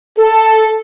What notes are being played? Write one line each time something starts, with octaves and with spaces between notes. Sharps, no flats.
A4